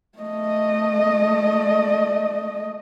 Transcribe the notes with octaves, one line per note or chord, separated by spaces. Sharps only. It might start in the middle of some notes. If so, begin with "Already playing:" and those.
A3 D#5